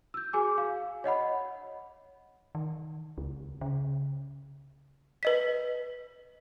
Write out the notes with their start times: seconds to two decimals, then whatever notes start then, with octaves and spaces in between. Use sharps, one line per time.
0.14 E6 G6
0.33 F#4 G#4 G#5 D6
0.58 F5
1.04 C#5 D#5 F#5 B5
2.55 D#3
3.18 C#2
3.61 C#3
5.23 B4 D#5 B6